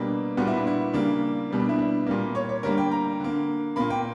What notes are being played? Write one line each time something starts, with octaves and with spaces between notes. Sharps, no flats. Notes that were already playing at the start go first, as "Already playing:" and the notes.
Already playing: B2 G3 A#3 D4
A#2 G3 B3 F#4
E4
D4
E4
C#3 G3 A#3 D4
B2 G3 B3
D4
E4
D4
A#2 G3 A#3
C#5
C#5
D3 G3 A#3 A#4
G5
A#5
D3 A#3
A#2 A#3 B5
G5